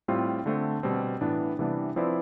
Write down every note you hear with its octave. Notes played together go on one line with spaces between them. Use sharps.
A2 G3 C4 F4
D3 A3 C4
B2 G3 C4
A2 E3 B3 D4
C3 E3 G3 B3 D4
F3 C4 E4 B4 D5